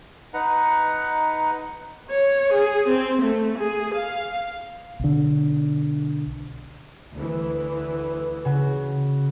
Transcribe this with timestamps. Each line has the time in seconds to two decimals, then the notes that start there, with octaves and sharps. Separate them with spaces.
0.34 D#4 B4 F#5 A#5
2.10 C#5
2.52 G#4
2.88 C4
3.22 A3
3.58 G#4
3.94 F5
4.99 B1 D3
7.14 D2 E3
8.45 C#3 F#4